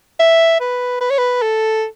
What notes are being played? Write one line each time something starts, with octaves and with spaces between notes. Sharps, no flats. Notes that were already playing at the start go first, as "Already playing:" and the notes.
E5
B4
B4
C#5
B4
A4